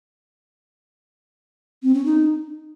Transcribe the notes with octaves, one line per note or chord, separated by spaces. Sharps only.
C4
C#4
D#4